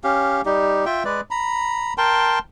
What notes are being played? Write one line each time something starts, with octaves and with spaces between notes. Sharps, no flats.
C#4 G4 F5
G3 D#4 G4
F4 E5 G5
G#3 B4 D5
A#5 B5
A#4 G5 A5 C6